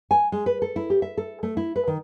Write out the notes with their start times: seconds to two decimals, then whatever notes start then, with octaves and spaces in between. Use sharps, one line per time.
0.11 G#5
0.32 G#3
0.46 B4
0.62 A4
0.76 E4
0.90 G4
1.02 E5
1.17 A4
1.43 A3
1.57 E4
1.76 B4
1.87 D#3